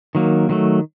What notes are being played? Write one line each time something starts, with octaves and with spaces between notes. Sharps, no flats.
D#3 F#3 A#3
D#3 F#3 A3